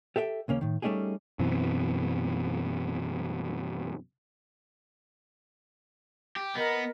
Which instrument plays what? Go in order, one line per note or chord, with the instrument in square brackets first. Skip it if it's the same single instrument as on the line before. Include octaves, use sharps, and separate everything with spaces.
[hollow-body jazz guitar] G4 A4 E5 F#5 G5
D#2 C#3 A#3 C#4
A2 D#3
G3 A3 C#4 D#4 G4 G#4
[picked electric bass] F#2 B2 E3 C4
[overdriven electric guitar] G4
[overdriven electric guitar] B3 [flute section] A#4 D#5